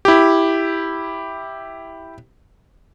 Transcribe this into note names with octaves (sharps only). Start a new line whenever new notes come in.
E4 G4